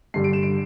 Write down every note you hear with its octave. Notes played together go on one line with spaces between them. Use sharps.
G2 D3 G3 D4 C7
D7
E7
D7